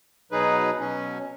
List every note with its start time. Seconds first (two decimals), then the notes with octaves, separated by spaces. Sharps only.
0.31 B2 F#3 D#4 G#4 B4
0.80 B2 F#3 C#4